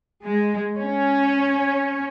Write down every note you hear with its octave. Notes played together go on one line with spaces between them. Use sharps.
G#3
C#4